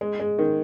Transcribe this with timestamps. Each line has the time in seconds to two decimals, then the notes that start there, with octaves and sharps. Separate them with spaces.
0.01 G#3
0.20 G#3
0.39 D#3